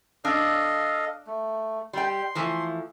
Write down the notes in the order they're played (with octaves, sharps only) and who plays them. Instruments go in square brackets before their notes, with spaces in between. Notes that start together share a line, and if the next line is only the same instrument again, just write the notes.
[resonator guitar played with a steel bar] D4 [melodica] A4 D#5 F5
[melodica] A3
[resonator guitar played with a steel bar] G3 G5 [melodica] C6
[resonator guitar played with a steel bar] E3 F3 A3